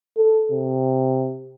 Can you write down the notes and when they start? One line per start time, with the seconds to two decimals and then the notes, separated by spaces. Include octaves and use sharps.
0.17 A4
0.52 C3